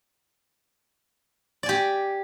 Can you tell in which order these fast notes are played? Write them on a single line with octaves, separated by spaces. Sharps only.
D5 G#5 G4